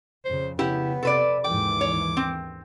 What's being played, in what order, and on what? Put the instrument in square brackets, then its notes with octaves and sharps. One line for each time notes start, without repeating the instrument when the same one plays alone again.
[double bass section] F2 C#3 [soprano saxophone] C5
[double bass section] C#3 [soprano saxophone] B3 [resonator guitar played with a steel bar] E4 G4
[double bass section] C3 [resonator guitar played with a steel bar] A4 B4 D5
[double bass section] D#2 G#2 E3 [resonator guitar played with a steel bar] G5 [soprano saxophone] D6
[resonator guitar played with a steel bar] C#5
C4